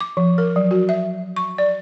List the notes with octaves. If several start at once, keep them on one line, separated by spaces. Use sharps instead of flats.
D6
F3
A#4
F#3
F#4
E5
C#6
D5